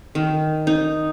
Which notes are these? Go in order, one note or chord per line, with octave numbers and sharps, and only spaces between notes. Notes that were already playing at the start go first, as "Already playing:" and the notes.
D#3
D#4